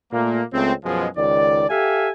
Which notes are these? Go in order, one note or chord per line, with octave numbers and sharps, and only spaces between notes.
A#2 A3 A#3
C#2 A3 C4
F#2 B2 F3 G#3
C#2 D#3 D5
G4 A4 E5 F5 G#5